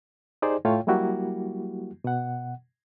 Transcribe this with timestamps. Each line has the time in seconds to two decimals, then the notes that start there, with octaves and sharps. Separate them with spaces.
0.42 D#4 G4 G#4 C5 D5
0.65 A2 A3 F4 C#5 F5 G5
0.87 F#3 G3 A#3 E4 F#4 G4
2.04 B2 F#5